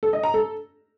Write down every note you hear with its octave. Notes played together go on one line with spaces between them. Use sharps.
A4
D#5
A#5
A4